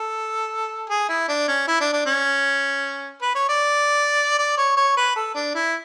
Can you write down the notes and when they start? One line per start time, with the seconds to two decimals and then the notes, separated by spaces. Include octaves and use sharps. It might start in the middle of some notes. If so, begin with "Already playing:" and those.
Already playing: A4
0.90 G#4
1.09 E4
1.28 D4
1.48 C#4
1.68 E4
1.81 D4
1.93 D4
2.06 C#4
3.22 B4
3.35 C#5
3.49 D5
4.39 D5
4.57 C#5
4.77 C#5
4.97 B4
5.16 A4
5.35 D4
5.55 E4